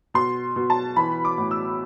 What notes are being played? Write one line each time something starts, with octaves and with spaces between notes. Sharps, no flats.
B2 C6
B2
A5
E3 B5
D6
A2
E6